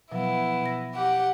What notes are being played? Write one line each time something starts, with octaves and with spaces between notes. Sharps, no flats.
B2 F3 F#3 B3 E4
B2 A#6
G4 F#5